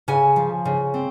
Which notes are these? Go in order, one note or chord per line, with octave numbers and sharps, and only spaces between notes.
C#3 G#5
F3
C#3
C4